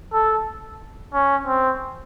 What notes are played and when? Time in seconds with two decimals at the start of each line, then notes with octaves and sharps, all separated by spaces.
0.13 A4
1.14 C#4
1.47 C4